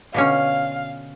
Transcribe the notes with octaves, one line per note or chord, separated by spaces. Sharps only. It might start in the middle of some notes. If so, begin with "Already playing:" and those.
B2 D3 C#4 F5